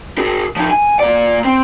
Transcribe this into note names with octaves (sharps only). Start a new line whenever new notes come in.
G#4 A#4
F3 D#4
G#5
A#2 D5
C4